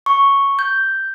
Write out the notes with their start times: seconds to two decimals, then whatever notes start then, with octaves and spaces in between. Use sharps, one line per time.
0.06 C#6
0.59 G6